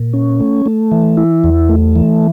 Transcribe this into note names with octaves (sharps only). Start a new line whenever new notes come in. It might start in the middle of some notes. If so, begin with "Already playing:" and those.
Already playing: A#2
C#4
A3
A3
E3
E4
E2
A3
E3